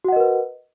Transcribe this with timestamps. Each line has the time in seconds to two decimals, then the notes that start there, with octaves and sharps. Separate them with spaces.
0.04 F#4
0.08 F#5
0.12 D#5
0.16 A#4
0.20 B4